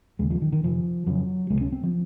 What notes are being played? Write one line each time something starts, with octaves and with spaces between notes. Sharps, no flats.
D#2 C#3 G#3
F3
D#3
D#3
F2 C3 F3
F2 C#3 F#3
C#2 C3 G#3
C#4
C4
F3